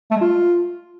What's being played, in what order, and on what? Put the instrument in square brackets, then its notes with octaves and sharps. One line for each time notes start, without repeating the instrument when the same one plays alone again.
[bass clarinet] A3
G#3
F4